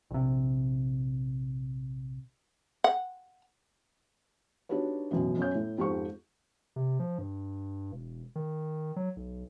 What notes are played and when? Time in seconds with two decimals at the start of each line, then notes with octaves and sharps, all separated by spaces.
0.11 A#1 C3
2.84 F#5
4.69 D4 D#4 F#4 G4 B4 C#5
5.11 A1 F#2 B2
5.37 F#2 C#4 C#5 G6
5.55 A2
5.78 F2 G#2 G4 C5 C#6
6.76 C3
7.00 F3
7.18 G2
7.92 E1
8.35 D#3
8.96 F#3
9.16 B1